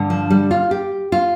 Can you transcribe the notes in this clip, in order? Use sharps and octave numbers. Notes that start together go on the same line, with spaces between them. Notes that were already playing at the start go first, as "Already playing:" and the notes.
Already playing: G2 D3
F3
G3
F4
G4
F4